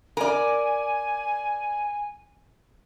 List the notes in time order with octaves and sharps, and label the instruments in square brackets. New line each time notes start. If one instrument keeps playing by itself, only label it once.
[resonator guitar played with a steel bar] A#4 D5 [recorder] G#5